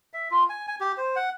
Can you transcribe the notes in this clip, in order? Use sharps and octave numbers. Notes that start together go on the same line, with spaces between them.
E5
F4
G#5
G#5
G4
C5
F#5